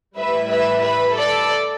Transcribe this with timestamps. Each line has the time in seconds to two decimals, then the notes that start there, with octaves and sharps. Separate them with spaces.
0.17 A2 G3 E4 B4 E5
0.50 B4 E5
0.83 B4
1.16 A4 D5